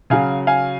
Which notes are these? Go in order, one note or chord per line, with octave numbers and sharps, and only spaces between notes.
C#3 F#3 F5 G#5
F5 G#5